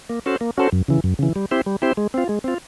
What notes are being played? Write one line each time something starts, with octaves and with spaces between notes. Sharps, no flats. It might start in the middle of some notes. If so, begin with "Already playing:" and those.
A#3
C#4 F#4 A4 C5
A#3
C#4 F#4 A4 C5
F#2
C#3 E3
F#2
C#3 E3
G3
C4 E4 G4 C5
G3
C4 E4 G4 C5
G#3
C4 F4
G#3
C4 F4